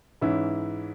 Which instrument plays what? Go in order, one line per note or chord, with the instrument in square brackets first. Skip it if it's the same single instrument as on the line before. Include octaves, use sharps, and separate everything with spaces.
[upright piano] G#2 E3 C#4 E4